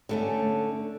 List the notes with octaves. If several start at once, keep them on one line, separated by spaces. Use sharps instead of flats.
D3 A3 C#4